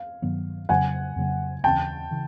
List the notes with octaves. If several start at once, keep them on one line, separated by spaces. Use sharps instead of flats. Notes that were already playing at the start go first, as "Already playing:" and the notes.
Already playing: F5
G2 D#3 F#3 B3
F2 C#3 F#3 A#3 F#5 G#5
F2 C#3 F#3 A#3
D#2 C#3 E3 G5 A5
C#3 E3